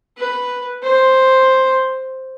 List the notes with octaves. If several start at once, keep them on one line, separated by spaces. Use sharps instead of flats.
B4
C5